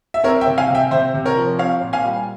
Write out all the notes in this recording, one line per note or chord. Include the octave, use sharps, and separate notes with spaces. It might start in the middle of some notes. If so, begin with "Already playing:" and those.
E5
C4 A#4 C#5
E5 G5
C3
F5 G#5
C3
E5 G5
C3 C5 E5
C3
A#4 C#5
F3
C4 C#5 F5
A#2
F5 G#5
G3